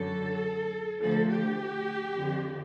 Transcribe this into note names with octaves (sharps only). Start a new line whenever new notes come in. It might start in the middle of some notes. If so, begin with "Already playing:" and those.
Already playing: F#2 D3 F#3 A4
D2 D3 F3 A4
G4
F2 D3 F3